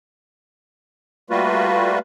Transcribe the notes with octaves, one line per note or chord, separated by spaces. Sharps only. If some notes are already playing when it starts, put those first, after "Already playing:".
G3 A3 A#3 F4 F#4 B4